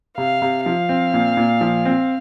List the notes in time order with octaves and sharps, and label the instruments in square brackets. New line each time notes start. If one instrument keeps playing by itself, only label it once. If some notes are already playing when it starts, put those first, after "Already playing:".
[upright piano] C3 [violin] F5
[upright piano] C3
[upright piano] F3 [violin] F5
[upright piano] C4
A#2
A#2
F3
C4